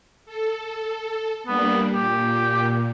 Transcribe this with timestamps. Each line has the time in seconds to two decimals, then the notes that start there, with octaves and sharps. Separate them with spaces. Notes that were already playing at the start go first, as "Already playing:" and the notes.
0.26 A4
1.47 G3 A#3 B3 D4
1.93 A#2 G4